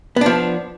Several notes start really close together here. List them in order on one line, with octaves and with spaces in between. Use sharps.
B3 D4 F3